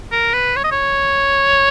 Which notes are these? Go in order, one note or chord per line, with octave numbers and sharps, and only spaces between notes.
A#4
B4
C#5
D#5
C#5